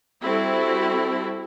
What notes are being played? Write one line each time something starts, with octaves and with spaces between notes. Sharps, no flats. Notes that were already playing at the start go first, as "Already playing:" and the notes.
G3 C4 E4 F#4 A4